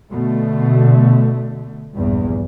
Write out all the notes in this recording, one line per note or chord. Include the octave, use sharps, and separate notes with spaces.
B2 D3 A3
A#1 E2 G2